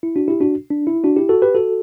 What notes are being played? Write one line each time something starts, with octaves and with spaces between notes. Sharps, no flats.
E4
D4 F#4
E4 G4
D4 F#4
D4
E4
D4 F#4
E4 G4
F#4 A4
G4 B4
F#4 A4